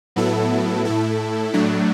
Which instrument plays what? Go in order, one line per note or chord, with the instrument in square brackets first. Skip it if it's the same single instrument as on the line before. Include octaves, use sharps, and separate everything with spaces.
[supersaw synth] A2 F#3 B3 E4 A4
A2 A3 E4 A4
A2 F#3 A3 D4